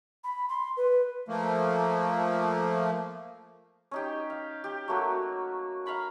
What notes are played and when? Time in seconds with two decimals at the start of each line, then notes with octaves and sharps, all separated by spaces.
0.24 B5
0.49 C6
0.77 B4
1.28 F3 A3 A#3
3.91 C#4 D#4 G4
4.30 F5
4.64 G4
4.88 F#3 A3 A#3 F#4
5.86 F5 A#5 B5 C#6